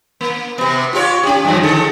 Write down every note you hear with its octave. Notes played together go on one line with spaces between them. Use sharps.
A#3
C3 B3
F4 G4 C#5
C#4 G4
F#2 F3
D3 G#4 A4